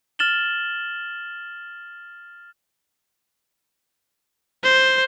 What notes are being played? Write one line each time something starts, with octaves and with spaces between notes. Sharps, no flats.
F6 A6 E7 F#7 G7
C5